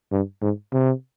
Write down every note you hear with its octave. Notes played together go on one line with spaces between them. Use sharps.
G2
G#2
C3